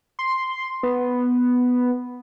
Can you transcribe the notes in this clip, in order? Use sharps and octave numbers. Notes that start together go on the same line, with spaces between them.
C6
B3